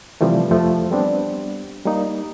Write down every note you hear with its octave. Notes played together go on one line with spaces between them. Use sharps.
C3 E3 F3 G3 A3
F2 F3 A3
G3 B3 C4 D4
G3 A#3 D#4